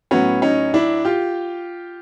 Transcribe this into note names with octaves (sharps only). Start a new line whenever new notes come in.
A2 F#3 B3 C#4
C#4 D#4
D4 E4
F4 G4